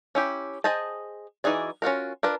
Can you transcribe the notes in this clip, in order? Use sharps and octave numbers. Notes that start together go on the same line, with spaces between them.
C#4 E4 G4
G#4 C5 D#5 G5 A5
E3 D#4 F#4 G#4 D5
C#4 F4 F#4 A#4
D4 F4 A#4 B4